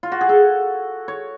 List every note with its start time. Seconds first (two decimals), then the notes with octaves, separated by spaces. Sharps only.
0.03 F4
0.12 F#4
0.21 G#4
0.29 A4
1.08 C#5